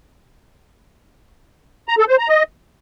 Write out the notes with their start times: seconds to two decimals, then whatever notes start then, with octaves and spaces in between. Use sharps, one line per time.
1.88 A#5
1.99 A4
2.09 C5
2.19 A#5
2.29 D#5